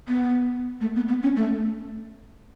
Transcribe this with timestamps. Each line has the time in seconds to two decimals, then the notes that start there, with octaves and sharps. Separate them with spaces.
0.08 B3
0.81 A3
0.96 B3
1.08 B3
1.23 C#4
1.37 A3